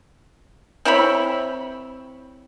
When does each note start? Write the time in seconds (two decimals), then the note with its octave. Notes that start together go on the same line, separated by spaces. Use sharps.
0.85 C4 E4 C#5 B5